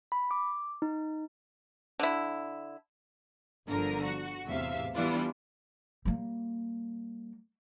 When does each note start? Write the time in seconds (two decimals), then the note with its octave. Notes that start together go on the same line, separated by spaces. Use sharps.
0.12 B5
0.31 D6
0.82 D#4
2.00 D3 E4
3.68 G1 D3 F3 A#4 A#5
4.02 F#4
4.46 E2 A2 C3 E5 F5
4.94 E3 G3 B3 D4 E4 F4
6.05 G3 A#3